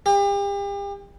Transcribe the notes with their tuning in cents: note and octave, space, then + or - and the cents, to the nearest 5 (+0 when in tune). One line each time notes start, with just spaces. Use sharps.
G4 +40